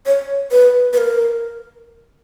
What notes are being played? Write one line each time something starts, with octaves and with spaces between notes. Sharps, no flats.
C#5
B4
B4
A#4